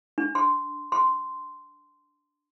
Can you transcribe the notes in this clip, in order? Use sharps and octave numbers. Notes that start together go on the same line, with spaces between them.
D4
C6
C6